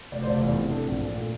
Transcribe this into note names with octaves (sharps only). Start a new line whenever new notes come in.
F1 D5
C5
F1 D5
E2
C3
D4 A4
A#1
A#2
A3